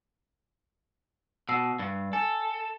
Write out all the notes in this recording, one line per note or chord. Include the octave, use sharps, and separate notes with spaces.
B2 E6 C7
G2
A4 G#5